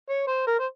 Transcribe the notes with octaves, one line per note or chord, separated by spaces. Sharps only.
C#5
C5
A#4
C5